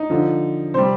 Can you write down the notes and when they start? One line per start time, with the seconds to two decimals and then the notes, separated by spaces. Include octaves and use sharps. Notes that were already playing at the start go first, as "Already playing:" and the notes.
Already playing: D#4
0.10 D3 F3
0.74 C3 G3 C5